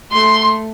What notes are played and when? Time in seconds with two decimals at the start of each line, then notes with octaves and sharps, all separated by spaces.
0.12 A3 C6